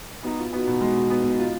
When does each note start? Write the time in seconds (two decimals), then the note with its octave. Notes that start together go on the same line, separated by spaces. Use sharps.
0.23 B3 D#4 F#4
0.39 F4
0.52 B3 D#4 F#4
0.67 B2
0.81 G#3
0.95 B2
1.10 B3
1.24 B2
1.38 F4